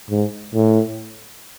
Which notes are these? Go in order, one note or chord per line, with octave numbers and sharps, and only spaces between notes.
G#2
A2